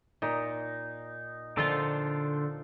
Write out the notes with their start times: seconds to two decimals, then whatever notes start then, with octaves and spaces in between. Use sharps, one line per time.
0.22 A#2 D#4
1.57 A#2 D3 F3 F4 A4 C5